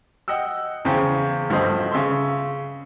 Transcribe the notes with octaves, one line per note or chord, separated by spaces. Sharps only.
D#5 F#5 G5 E6
E2 C#3 C5 G5
D2 G2 D3 F3 C5 D#5
C#3 E5 C6